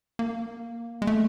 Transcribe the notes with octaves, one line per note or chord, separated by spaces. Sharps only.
A#3
G#3
A3